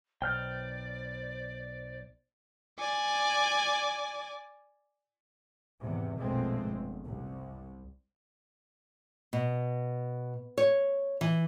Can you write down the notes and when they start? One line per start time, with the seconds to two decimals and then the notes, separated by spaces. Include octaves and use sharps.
0.22 B1 C5 D5 G5 F6 G6
2.79 D5 G#5
5.82 E2 G#2 C3
6.20 A#1 F2 B2 G#3 A3 C4
6.67 G1
7.05 C2
9.33 B2
10.58 C#5
11.21 E3